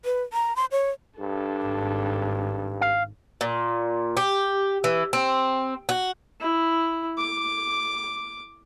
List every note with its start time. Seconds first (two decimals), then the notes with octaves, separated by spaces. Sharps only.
0.05 B4
0.33 A#5
0.56 C6
0.72 C#5
1.20 G2 D4 A4
1.65 G#1
2.81 F5
3.41 A#2
4.17 G4
4.84 E3
5.13 C4
5.89 F#4
6.41 E4
7.18 D6